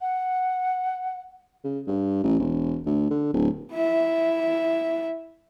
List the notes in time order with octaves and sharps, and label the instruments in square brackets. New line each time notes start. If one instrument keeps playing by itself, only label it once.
[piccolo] F#5
[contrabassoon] C#3
G2
A1
E1
D2
D3
D1
[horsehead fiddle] E4 E5